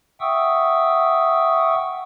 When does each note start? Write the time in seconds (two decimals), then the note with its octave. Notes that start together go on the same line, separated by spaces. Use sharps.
0.21 E5 F#5 G5 C#6 D#6 E6